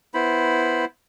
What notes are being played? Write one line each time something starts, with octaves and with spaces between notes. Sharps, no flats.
B3 E4 C5 B5